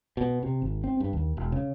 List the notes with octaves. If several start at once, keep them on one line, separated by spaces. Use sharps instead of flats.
B2
C3
G#1
C4
G2
D#2
E1
C#3